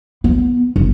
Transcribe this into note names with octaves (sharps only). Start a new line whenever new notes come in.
B3
G1